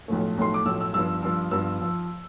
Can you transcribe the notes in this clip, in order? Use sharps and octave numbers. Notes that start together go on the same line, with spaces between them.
B1 A2 F3 A3
B1 A2 F3 A3 C6
D6
B1 A2 F3 A3 E6
E6
G2 F3 B3 E6
G2 F3 B3
G2 F3 B3 E6
F3